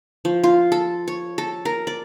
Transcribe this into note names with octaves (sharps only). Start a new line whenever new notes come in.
F3
F4
A4
C#5
A4
A#4
D5